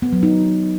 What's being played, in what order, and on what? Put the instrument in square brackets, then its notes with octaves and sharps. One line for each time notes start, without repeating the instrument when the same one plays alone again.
[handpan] B3
F#3
D#4